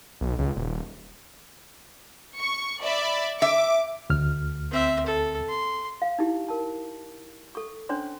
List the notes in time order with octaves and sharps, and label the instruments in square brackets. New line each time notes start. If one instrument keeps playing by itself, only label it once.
[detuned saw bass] B1
C#2
D#1
[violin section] C#6
D5 E5 B5
[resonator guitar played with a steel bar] E5 [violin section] D6
[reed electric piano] D2 F6
[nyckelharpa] C4 E5
A4
C6
[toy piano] F5
D#4 E4 G4
A#4 A5
A4 C#6
C#4 D4 C5 C#5 C6